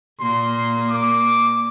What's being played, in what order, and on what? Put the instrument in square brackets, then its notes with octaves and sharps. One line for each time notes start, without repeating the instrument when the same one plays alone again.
[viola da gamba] A#2 A#3 [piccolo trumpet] C6
[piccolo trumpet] D6